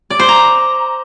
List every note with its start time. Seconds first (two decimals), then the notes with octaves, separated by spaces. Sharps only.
0.10 D5
0.19 C5
0.29 A#5